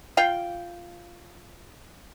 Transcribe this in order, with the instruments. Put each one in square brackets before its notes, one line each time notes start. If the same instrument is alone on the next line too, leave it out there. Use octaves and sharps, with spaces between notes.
[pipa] F4 F5 G5